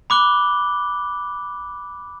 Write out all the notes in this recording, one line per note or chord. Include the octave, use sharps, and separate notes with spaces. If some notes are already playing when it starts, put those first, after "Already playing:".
B5 D6 F#6 G7